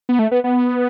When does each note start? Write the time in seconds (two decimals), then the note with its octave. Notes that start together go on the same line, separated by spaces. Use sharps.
0.09 B3
0.19 A3
0.31 B3
0.44 B3